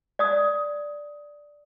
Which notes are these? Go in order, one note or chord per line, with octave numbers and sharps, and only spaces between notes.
D5 D#6